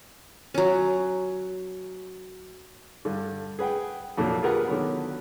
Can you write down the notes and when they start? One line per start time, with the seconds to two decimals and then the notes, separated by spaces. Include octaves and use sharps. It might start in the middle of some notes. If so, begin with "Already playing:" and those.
0.54 F#3 C#4
3.05 G2 D3
3.59 G#4 B4 F#5 G5
4.17 F2 A#2 D3 F#3
4.43 F4 G4 G#4 A#4 B4 F#5
4.68 D3 D#3 F#3 B3